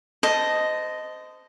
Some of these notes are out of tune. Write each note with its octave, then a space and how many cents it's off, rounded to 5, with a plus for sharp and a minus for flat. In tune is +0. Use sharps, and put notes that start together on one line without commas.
C5 -25 D#5 +0 A5 +0